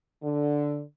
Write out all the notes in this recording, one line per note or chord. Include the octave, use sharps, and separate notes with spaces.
D3